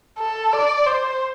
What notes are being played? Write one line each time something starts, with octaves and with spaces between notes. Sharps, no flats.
A4
D5
C5